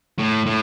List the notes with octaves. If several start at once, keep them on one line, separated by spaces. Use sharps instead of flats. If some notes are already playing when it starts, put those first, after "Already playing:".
A2
A2